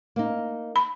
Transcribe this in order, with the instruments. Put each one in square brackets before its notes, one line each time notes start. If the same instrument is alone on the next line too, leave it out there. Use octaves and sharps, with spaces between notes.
[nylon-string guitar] A#3 D#4
[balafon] B5